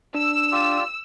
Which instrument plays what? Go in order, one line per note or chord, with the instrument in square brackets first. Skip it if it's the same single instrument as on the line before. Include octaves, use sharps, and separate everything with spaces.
[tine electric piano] D4 [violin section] E6
[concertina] F4 G4 D5